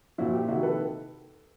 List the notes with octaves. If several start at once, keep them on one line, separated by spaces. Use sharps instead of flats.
A#2 F3 E4 F#4
F4 G4
C3 D#3 E4 F#4
A4 B4